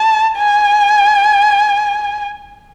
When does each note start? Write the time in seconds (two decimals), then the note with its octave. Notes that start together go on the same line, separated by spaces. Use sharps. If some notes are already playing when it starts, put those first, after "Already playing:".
Already playing: A5
0.38 G#5